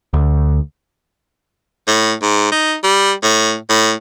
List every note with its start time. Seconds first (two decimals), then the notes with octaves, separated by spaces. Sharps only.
0.13 D2
1.87 A2
2.22 G#2
2.52 D#4
2.83 G3
3.23 A2
3.69 A2